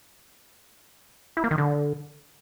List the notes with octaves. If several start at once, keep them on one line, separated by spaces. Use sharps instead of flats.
E4
A#3
D#3
D3